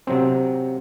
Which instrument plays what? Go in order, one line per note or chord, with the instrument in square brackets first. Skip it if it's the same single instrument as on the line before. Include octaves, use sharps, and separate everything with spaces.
[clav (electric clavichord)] C3 F#3 C4